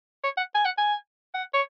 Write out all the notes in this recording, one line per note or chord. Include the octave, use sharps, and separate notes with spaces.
C#5
F#5
G#5
F#5
G#5
F#5
C#5